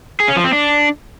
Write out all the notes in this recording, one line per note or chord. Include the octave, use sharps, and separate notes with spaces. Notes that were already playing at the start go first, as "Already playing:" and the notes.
G#4
C#4
F3
C4
D4